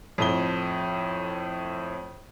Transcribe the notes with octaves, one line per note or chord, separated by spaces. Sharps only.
F2 A2 G7